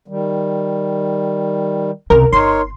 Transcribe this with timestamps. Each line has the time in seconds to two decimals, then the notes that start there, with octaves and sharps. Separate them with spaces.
0.08 D#3 G3
2.10 C2 C#3 A#4
2.33 G1 D#4 A#4 C#5 C6